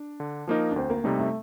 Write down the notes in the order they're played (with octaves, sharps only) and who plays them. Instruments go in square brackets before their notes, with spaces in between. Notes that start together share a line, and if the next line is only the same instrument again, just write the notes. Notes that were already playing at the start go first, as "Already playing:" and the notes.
Already playing: [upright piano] D4
[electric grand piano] D3
F3 A#3 D#4 A#4
[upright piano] D4
[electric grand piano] D2 [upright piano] C4
[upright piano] A#3
[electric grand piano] C3 G3 C4 D#4 [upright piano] A3
[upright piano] A3